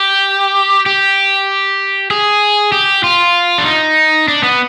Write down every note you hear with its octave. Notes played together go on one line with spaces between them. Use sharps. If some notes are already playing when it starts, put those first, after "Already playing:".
Already playing: G4
G4
G#4
G4
F4
D4
D#4
D4
B3